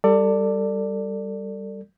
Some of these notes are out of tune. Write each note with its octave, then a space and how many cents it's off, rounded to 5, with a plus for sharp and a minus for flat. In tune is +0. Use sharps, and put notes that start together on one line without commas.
G3 +5 A4 +30 D5 +0